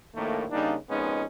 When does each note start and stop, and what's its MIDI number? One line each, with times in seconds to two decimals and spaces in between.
0.15 0.45 34
0.15 0.45 45
0.15 0.45 51
0.15 0.45 57
0.15 0.45 58
0.51 0.75 49
0.51 0.75 55
0.51 0.75 58
0.51 0.75 62
0.51 0.75 63
0.90 1.24 41
0.90 1.24 46
0.90 1.24 56
0.90 1.24 59
0.90 1.24 61
0.90 1.24 63